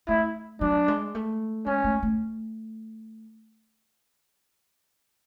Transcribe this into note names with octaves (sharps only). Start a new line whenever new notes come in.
A3 E4
F#3 D4
G#3
A3
G#3 C#4
A3
A3